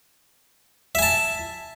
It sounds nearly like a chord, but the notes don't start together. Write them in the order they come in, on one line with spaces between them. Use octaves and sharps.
E5 G#5 A5